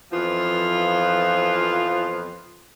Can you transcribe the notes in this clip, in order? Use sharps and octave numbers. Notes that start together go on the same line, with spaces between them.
F2 E3 F3 B3 F4